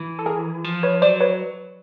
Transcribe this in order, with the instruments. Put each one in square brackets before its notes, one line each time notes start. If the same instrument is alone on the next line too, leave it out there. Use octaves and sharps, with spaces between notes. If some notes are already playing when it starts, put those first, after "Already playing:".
Already playing: [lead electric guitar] E3
[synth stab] A4
G#4 A#4
[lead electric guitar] F3
[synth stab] B4 C#5
[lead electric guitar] F#3 [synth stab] C5 D5
[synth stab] B4 C#5